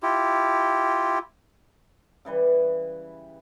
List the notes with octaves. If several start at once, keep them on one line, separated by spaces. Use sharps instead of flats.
E4 F4 G4
C#3 E3 G3 B4